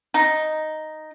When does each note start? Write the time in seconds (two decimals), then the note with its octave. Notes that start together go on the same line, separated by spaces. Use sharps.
0.14 D#4